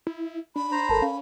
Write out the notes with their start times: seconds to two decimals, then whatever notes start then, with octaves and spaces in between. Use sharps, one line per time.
0.07 E4
0.56 D4 B5
0.72 C5 A#5
0.89 G1 A4 A#4 A5
1.02 C#4 F5